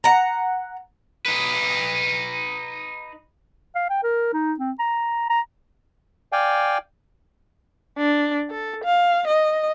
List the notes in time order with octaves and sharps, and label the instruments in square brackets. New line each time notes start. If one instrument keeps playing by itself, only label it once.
[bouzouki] F#5 A#5
[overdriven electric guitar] D#4 B4
[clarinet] F5
G5
A#4
D#4
C4
A#5
A#5
[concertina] D5 F5 G5 G#5
[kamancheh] D4
A4
F5
D#5